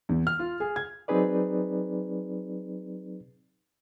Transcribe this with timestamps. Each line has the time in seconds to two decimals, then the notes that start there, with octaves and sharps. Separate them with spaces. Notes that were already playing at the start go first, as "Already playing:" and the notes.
0.09 E2
0.27 F6
0.39 F4
0.60 G#4
0.76 G#6
1.08 F#3 C4 D#4 G#4 B4 D5